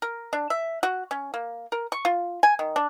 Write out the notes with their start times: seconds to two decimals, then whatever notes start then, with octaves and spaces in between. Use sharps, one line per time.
0.02 A#4
0.33 D4
0.50 E5
0.83 F#4
1.11 C#4
1.34 A#3
1.72 A#4
1.92 C#6
2.05 F4
2.43 G#5
2.59 D#3
2.76 D4